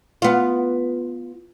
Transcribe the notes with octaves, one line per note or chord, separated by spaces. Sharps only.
B3 F4